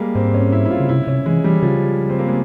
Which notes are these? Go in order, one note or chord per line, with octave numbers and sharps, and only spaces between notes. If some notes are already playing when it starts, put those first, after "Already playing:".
Already playing: G3 G#3 A#3
G#2 C4
C#4
E4
E4
F4
C#3
C3 E4
C3 C#4
E3 G#3
E3 G3
C#3 F3
C4
A#3
G#3